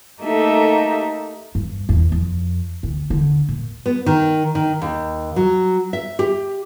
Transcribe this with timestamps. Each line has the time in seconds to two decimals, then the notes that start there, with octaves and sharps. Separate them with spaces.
0.21 A3 A#3 D#4 G4 A4 E5
1.55 G2
1.89 E2
2.12 F2
2.83 D2
3.10 D3
3.49 A#2
3.86 B3
4.06 D#3
4.55 D#3
4.82 D#2
5.36 F#3
5.93 E5
6.19 G4